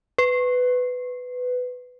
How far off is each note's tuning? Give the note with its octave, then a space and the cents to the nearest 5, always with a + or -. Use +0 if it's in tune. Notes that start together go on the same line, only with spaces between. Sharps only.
B4 +15